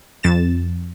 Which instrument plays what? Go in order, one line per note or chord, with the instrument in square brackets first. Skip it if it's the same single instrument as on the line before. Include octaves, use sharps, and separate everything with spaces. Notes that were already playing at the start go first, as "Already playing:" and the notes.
[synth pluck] F2 A6 E7